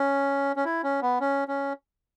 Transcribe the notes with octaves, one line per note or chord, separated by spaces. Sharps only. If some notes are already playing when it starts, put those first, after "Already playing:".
Already playing: C#4
C#4
E4
C#4
B3
C#4
C#4